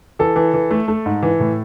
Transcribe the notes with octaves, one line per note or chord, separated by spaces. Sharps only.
E3 A4
E3
E3
A3
A3
G#2
E3
A2